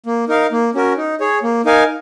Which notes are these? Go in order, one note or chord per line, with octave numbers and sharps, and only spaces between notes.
A#3
D#4 A#4 F5
A#3
C#4 F#4 A#4
D#4
G#4 C#5
A#3
D#4 A#4 F5 G#5